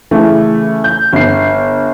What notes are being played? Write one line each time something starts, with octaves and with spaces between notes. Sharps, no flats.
C#3 E3 A3
G6
G1 C7